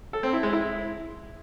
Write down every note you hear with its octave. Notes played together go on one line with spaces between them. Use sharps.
A4
C4
E4
G#3
E4